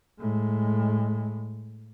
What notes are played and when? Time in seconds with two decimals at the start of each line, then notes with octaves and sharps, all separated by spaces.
0.20 A2 G#3